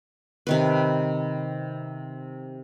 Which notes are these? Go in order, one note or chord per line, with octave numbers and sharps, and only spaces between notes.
C3 D#3 B4